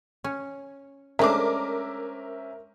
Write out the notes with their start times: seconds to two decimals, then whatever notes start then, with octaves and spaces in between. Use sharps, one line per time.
0.24 C#4
1.19 G#3 A3 C#4 D4 A#4 C5 E5 D6